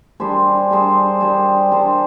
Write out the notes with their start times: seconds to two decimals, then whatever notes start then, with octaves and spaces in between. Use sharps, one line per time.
0.20 G3 D4 G#4 C5
0.71 G3 D4 G#4 C5
1.20 G3 D4 G#4 C5
1.71 G3 D4 G#4 C5